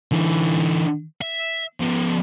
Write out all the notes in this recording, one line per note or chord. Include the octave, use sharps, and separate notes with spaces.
D3 E3
E5
F3 B3